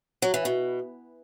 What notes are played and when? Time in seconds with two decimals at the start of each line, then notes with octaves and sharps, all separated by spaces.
0.22 F#3
0.34 E3
0.45 B2